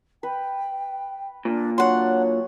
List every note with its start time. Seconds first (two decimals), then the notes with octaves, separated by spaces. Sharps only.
0.23 B4 G5
1.45 A#2 D4
1.78 F#3 D4 C#5 F#5 C6